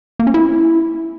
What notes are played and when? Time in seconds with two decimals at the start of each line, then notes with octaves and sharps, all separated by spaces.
0.19 A#3
0.27 C#4
0.34 E4